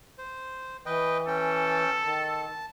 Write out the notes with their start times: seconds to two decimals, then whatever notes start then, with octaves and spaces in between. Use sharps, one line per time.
0.18 C5
0.86 E3 B4 D#5 G5
1.27 C#4 A4 G5
2.02 D#3 A5